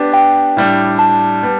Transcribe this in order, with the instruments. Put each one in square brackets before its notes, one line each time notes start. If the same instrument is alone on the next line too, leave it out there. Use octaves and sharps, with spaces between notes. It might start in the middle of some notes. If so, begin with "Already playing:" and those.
Already playing: [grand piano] B3 D4 G4
[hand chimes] G5
[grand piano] A2 G3 D4
[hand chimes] A5
[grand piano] G3 B3